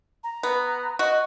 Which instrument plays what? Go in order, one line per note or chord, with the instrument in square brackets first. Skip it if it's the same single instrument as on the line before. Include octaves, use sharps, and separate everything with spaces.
[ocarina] A#5
[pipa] B3
[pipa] F#4 [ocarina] D#5